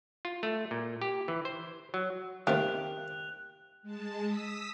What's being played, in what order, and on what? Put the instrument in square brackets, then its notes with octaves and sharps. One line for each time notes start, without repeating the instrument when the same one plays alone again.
[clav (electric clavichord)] F4
A3
A#2
G4
E3
C5
F#3
[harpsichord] D#3 A3 C4 [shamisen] A#3 [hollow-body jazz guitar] G4 [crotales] F#6 F7
[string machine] G#3 A5
D#6 E6 B6